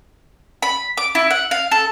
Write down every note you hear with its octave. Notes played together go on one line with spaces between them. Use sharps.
B5
D6
E4
F#5
F5
A4